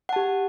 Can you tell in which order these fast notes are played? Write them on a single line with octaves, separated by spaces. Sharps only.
F#5 A5 G4